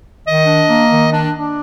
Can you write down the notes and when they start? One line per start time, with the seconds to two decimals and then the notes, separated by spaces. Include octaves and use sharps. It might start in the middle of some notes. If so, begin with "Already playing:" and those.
0.24 D#3 D#5
0.46 D4
0.68 A#3
0.90 D#3
1.12 D4
1.34 D4